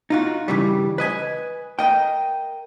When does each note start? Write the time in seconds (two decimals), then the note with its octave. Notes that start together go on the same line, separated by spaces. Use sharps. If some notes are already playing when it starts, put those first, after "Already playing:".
0.10 D#4 F4 F#4
0.48 G2 C#3 E3 G3
0.98 B4 D#5 G#5
1.79 A#4 D#5 G5